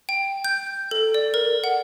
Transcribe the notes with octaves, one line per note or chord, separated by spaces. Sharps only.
G5
G6
A4
D5
A#4
F#5